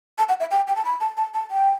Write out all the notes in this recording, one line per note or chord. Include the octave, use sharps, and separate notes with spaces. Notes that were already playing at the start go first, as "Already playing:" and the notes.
A5
F#5
E5
G5
G5
A5
B5
A5
A5
A5
G5